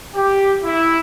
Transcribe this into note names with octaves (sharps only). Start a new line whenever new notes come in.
G4
E4